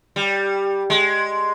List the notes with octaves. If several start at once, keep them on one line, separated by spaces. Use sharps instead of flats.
G3
G#3